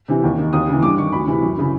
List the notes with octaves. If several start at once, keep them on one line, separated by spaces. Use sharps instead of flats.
C3 E3
D#2
D#3
D#2 D#6
C#3 E3
G2 D6
D#3 C#6
D2 B5
C3 E3
F#2
C#3 E3